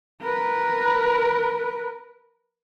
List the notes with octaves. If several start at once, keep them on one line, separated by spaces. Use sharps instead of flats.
A#4 B4